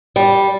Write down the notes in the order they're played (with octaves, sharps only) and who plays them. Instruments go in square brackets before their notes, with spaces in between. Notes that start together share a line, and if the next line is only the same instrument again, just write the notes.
[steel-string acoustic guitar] G3